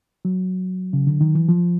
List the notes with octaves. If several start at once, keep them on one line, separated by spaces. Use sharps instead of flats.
F#3
C#3
D3
D#3
E3
F3